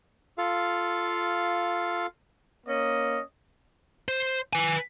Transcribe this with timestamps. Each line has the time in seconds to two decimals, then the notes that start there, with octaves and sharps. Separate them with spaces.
0.38 F4 A4 F5
2.66 A#3 C#4 D#5
4.08 C5
4.53 B4 G#5